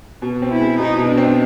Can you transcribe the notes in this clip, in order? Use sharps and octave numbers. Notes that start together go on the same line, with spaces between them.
B2
C4
E4
G#3
B2 D#4
B2
D4
C4